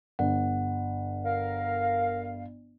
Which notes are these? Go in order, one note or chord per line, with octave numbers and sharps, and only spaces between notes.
G1 F#5
A#4 F5